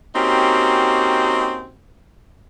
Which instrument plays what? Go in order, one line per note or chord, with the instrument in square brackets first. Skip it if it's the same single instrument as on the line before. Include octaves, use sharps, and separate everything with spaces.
[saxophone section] A#3 C4 C#4 D#4 F#4 G4